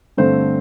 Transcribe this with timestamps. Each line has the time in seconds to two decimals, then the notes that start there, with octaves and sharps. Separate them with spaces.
0.17 G2 D3 A3 C4 C5